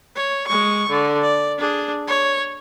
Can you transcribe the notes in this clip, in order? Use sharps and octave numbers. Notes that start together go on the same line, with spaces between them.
C#5
G#3 C#6
D3
D5
D4 G#4
C#5